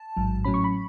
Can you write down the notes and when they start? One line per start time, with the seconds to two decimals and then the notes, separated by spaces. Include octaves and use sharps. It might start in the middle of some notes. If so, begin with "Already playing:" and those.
Already playing: A5
0.16 A1 G#2 F#3
0.44 A2 F#3 C#4 B5
0.54 C#6
0.64 B5